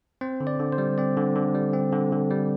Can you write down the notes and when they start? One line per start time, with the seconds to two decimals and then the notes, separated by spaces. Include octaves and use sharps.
0.21 C4 C5
0.40 D3
0.47 D5
0.59 D3
0.72 C5
0.78 G3
0.98 C4 D5
1.17 D3
1.36 D3
1.55 G3
1.74 C4
1.93 D3
2.12 D3
2.30 G3